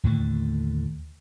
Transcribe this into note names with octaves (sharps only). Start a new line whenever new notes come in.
D#2 A2 D3 A3